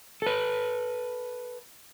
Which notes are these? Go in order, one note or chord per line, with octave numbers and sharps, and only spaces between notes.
A4 B4